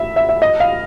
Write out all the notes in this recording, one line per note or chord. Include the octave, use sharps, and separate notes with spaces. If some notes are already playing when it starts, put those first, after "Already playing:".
Already playing: E5
E5
E5
D#5
F5